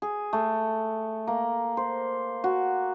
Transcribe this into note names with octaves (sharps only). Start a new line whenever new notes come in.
G#4
A3
A#3
C5
F#4